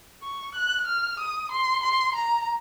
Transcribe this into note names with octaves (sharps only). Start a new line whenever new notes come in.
C#6
F#6
F6
D#6
C6
C6
A#5